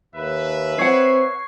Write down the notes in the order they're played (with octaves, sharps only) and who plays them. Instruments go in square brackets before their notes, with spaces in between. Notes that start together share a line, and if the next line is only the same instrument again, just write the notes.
[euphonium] D#2 [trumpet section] B4 E5
[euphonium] C4 [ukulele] C#5 F#5 [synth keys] C#6 G#6 C7